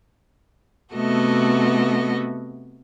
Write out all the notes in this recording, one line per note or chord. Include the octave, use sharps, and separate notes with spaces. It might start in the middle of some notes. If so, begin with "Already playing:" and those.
C3 A3 B3 F#4 A4 D#5